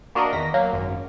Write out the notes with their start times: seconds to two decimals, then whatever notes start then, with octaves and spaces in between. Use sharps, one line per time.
0.15 A#3 D4 F#4 A#4 D5 D#5
0.33 E2 D#3 A#6 B6
0.54 F#3 A#3
0.72 G#1 F#2